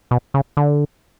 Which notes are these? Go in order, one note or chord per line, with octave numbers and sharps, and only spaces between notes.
B2
C#3
D3